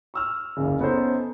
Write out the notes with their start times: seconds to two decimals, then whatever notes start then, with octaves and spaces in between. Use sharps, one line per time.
0.14 C#6 E6 F6
0.57 F#1 C#2 C#3
0.80 B3 C#4 D#4 A4 C5